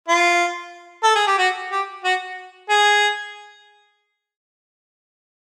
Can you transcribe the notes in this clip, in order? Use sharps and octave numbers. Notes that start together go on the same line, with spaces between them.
F4
A4
G#4
G4
F#4
G4
F#4
G#4